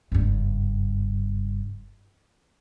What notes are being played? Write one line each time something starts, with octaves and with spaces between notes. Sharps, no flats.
F#1 G2